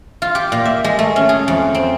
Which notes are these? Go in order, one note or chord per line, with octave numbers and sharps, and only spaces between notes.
F4
G4
A#2
E5
G#3
A3
C#4
G#4
F2
C4